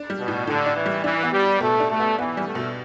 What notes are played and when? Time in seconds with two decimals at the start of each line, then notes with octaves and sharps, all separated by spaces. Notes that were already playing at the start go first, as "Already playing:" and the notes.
Already playing: D4
0.10 G3
0.19 B2
0.28 A2
0.47 A2 D3
0.66 D4
0.76 E3
0.86 G3
1.04 E3 D4
1.23 B3
1.33 G3
1.43 G4
1.61 B2 A3
1.80 D4
1.90 A3
2.00 B3
2.18 E3 B3
2.37 G3
2.47 A3
2.55 B2